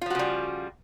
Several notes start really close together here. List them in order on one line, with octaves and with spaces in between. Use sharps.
F4 F3 F#4 C#3 G3